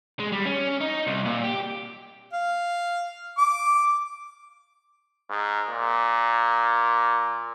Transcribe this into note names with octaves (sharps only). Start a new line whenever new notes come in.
G#3
G3
C#4
D#4
C2
A#2
G4
F5
D6
G#2
A#2